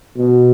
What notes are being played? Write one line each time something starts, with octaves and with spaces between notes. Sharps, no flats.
B2